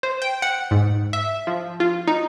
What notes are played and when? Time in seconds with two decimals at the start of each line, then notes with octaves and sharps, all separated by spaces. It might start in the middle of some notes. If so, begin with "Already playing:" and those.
0.03 C5
0.22 G5
0.42 F#5
0.71 G#2
1.13 E5
1.47 F3
1.80 F4
2.07 D#4